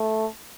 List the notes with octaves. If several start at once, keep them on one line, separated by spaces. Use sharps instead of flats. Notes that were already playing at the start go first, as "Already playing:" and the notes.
Already playing: A3